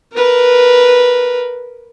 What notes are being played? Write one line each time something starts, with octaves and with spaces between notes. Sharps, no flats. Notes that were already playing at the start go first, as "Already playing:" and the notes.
A#4 B4